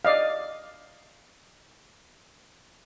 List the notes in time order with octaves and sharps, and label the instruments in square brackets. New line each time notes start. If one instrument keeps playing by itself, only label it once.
[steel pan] D5 D#5 F5